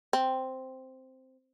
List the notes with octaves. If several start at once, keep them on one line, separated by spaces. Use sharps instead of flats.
C4